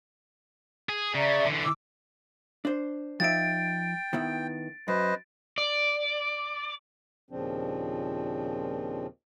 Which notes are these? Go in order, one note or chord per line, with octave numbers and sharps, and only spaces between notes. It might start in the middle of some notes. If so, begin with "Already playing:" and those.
G#4
C#3 D5 E5 A#5
D3 E3
D6 E6
D4 C5
F3 D#4 E5 G5 A6 D7
D#3 B3 E4
F#2 B4 C5 D#5
D5
D#2 A#2 C#3 F3 C4 D4